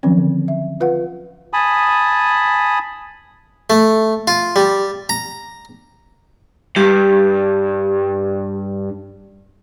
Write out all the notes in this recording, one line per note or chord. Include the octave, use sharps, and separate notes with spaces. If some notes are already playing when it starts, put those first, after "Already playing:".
D#3 F3 F#3 C4 C#4
D3
E5
F4 B4 F5 F#5
G#5 A5 B5 D#6
A3
F4
G3
A#5
G2 G4